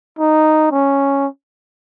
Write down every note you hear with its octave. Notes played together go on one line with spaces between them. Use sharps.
D#4
C#4